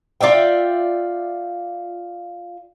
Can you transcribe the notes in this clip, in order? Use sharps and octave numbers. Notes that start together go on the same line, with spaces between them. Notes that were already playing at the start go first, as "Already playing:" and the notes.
F4 D5 E5 G5